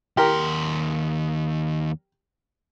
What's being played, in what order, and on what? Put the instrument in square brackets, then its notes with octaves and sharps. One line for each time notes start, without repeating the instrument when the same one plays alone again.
[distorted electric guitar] D#2 C6 [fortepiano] G4 A#4